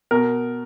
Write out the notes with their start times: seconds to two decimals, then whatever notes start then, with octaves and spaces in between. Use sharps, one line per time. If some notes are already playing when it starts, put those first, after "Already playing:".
0.11 B2 A#4